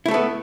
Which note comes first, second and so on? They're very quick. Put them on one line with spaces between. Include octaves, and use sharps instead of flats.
E4 A3 A4 B3